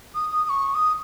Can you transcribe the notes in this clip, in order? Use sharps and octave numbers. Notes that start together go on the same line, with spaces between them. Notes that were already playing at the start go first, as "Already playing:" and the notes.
D#6
D#6
C#6
D#6